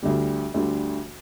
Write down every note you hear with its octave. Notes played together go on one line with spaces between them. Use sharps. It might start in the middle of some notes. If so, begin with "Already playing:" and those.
D2 D3 G3
D2 D3 G3